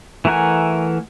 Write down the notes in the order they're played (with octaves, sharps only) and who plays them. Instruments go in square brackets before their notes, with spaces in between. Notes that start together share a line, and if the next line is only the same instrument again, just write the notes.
[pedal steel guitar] E3 A3 A#4 F#5 G#5